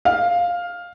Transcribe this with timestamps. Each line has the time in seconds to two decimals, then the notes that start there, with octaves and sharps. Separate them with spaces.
0.05 F5